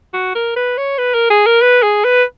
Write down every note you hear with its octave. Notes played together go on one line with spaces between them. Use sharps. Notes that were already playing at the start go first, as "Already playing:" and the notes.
F#4
A#4
B4
C#5
B4
A#4
G#4
A#4
B4
G#4
B4